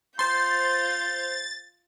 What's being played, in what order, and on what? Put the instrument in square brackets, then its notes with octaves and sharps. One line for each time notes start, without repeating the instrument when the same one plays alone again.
[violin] F4 G6 [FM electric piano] C5 C7 [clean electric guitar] C6 [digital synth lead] A6